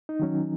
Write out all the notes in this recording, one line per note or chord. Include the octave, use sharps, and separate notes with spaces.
D#4
D#3 F#3 C#4